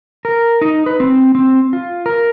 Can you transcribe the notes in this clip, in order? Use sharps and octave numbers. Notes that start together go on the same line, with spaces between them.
A#4
D#4
B4
C4
C4
F4
A#4